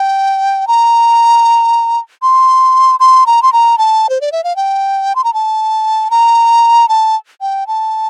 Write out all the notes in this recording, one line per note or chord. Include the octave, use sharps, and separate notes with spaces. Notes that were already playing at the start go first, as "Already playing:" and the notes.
Already playing: G5
A#5
C6
C6
A#5
C6
A#5
A5
C5
D5
E5
F5
G5
C6
A#5
A5
A#5
A5
G5
A5